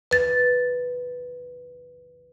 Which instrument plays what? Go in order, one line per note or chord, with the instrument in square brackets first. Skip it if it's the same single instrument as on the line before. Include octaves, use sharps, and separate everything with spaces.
[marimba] B4 A6